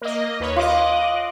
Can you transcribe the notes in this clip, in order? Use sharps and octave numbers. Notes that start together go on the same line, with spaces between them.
A#3 D#5
D#2 B4 C#5
F4 D#5 D6 F#6